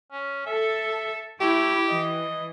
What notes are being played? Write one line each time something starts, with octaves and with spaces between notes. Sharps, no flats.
C#4
A4 E5
A3 E4 G4
E3 D#5